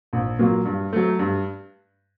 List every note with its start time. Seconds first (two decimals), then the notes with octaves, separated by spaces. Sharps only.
0.13 A#1
0.39 A#2 F#3 A#3
0.65 G2
0.93 F#3 A3
1.19 G2